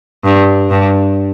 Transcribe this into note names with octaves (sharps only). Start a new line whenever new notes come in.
G2
G2